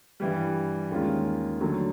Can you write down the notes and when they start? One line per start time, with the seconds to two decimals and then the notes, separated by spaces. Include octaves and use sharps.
0.20 G2 E3 G3
0.91 D#2 D#3 G#3 C#4 F4
1.61 D3 F#3 A3